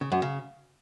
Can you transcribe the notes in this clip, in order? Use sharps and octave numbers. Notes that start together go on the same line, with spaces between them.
C#3
F#2
C#3